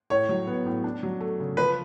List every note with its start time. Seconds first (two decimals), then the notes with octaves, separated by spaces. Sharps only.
0.10 A2 C#5
0.29 F#3
0.47 B3
0.66 A2
0.84 D4
1.03 F#3
1.20 A3
1.40 C#3
1.57 F3 B4